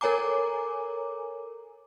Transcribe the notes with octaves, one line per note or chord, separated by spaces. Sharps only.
A4 A#4 C#5 G#5 A#5 D6